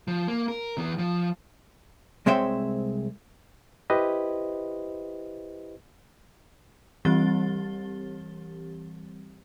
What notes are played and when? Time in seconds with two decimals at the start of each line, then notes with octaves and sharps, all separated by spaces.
0.08 F3
0.28 A#3
0.48 A#4
0.78 E3 B3
0.98 F3
2.26 C2 G#3 C4 C#5 E5 G5
3.90 E4 G4 B4 C5 D#5
7.05 E3 G3 C4 G4 A6 G7